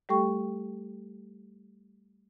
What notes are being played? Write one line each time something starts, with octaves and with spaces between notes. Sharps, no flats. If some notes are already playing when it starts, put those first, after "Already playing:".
G3 A3 G4 A4 G5 C#6